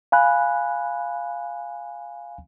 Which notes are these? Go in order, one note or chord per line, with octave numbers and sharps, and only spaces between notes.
F5 G#5 B5 F#6